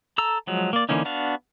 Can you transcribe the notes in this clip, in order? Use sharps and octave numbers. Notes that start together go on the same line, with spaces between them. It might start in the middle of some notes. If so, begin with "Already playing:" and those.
A4 A#5 E6
F3 F#3 G#3
A#3 D5
D3 E3 A#3 C#4 D#4
B3 D4 F#4 F5